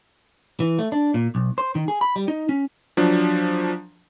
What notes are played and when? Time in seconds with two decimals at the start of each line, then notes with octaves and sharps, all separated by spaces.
0.60 E3
0.79 A3
0.92 D4
1.14 A#2
1.35 B1
1.58 C5
1.75 D#3
1.88 G#4
2.01 B5
2.16 G3
2.28 D#4
2.49 C#4
2.97 F3 F#3 D4